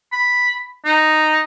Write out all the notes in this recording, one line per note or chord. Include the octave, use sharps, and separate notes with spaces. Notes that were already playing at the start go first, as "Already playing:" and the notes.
B5
D#4